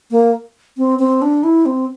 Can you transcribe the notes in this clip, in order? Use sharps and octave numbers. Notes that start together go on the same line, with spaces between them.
A#3
C4
C4
D4
E4
C4